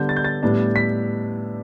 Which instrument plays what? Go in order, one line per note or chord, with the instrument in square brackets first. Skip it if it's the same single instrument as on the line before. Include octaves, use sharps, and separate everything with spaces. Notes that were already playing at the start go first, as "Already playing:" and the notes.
Already playing: [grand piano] D3 G3 B3 G6
A6
G6
A6
A2 G3 B3 D4
B6